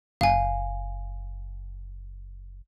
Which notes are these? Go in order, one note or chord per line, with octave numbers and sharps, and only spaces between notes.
F#1 F5 G#5